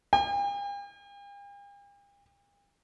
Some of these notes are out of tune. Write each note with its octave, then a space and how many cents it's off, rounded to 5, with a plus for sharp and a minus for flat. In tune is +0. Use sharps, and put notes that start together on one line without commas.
G5 +45